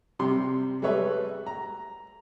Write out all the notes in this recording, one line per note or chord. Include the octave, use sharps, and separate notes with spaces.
C3 G3 C6
G3 G#3 A4 B4 C#5 E5
A#5